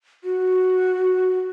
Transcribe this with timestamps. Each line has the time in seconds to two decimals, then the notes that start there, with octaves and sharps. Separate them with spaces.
0.24 F#4